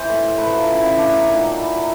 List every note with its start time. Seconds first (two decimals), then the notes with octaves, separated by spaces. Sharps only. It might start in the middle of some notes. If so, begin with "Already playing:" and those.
Already playing: E3 C5
0.08 A2
0.23 A2
0.38 A3 B4
0.52 F#3
0.58 F4
0.68 C#3
0.78 E4
0.83 C#3
0.97 A3 D4
1.12 F#3
1.28 A#2 D#4
1.43 A#2
1.57 A3 E4
1.72 F#3